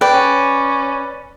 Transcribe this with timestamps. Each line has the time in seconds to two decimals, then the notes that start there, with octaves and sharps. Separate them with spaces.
0.01 B4 D5 G5
0.13 C#4